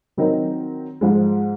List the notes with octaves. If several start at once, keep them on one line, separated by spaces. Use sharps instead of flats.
D#3 F#3 C4 D#4 A#4
G#2 F3 G#3